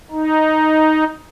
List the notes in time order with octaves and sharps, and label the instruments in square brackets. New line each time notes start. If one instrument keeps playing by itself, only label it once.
[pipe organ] D#4